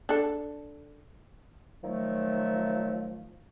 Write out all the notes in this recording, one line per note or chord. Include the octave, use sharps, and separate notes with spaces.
D4 A4
D#3 F3 F#3 A3